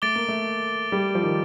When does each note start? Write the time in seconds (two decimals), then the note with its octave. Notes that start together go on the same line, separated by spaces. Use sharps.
0.02 A3 D6 A6 D7 G7
0.15 A#3
0.28 A3
0.92 G3
1.15 F3
1.23 D#3